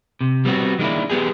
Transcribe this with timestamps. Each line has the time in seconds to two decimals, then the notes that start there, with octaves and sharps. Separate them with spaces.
0.21 C3
0.45 G3 B3 C4 E4 F#4
0.79 D#3 G#3 A#3 D4 E4
1.10 G#3 B3 G4 G#4